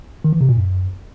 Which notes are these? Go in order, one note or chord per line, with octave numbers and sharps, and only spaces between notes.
D#3
E3
C3
A#2
F#2